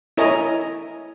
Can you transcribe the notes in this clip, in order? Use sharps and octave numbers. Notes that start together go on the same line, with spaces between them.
E4 A#4 C#5 D#5 G#5 A#5